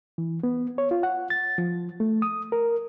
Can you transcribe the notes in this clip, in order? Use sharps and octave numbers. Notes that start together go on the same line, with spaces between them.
E3
B3
C#5
F4
F#5
A6
F3
A3
D#6
A#4